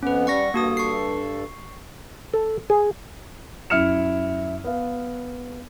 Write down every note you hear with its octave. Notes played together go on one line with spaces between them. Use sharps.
F2 B3 C#4 B4
G3 F#5 C#6 A#6
G2 A#3 F#4 A4 D#6
C#6 C7
A4
G#4
F#2 E4 F6 C#7 E7
B3 F5